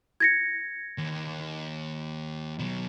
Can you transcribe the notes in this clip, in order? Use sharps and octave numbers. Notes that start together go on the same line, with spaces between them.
G#6 A#6 C#7
D#2
B2 F#3